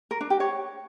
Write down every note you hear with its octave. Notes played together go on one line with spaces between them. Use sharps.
A#4
D4
G4
C#5